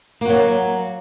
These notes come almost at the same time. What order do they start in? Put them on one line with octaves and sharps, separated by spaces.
A#3 F#4 F#3